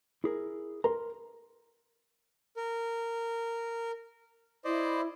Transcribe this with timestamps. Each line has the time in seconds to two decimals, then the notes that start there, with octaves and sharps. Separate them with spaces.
0.24 E4 G#4 A#4
0.84 A#4 A#5 C6
2.56 A#4
4.64 E4 C5 D5 D#5